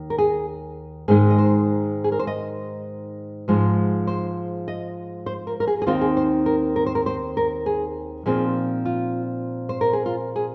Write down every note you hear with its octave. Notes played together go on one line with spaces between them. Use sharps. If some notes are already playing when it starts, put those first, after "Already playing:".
Already playing: D#2 D#3
A#4
G#4
G#2 D#3 G#3 D#4 G#4
D#5
C5
G#4
A#4
C5
D#5
G#2 F3 G#3 D#4
C5
D#5
C5
A#4
A#4
G#4
G#4
D#2 D#3 C4 D#4 F4
G#4
C5
A#4
A#4
C5
A#4
C5
A#4
G#4
A#2 F3 C4 D#4 G#4
F4
C5
A#4
G#4
F4
G#4